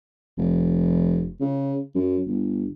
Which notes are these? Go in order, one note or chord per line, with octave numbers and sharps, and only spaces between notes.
F1
C#3
F#2
G1